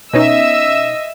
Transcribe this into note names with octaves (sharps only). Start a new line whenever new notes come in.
B2 C#4 D#4 D#5 E5 E6